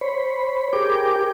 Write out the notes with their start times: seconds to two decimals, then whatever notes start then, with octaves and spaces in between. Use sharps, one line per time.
0.01 C5 C#5 B5
0.73 G4 G#4 A#4 G5 D6